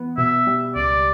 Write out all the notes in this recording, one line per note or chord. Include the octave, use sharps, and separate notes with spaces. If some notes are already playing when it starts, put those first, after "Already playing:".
Already playing: E3 B3
B2 E5
G3
C#2 D5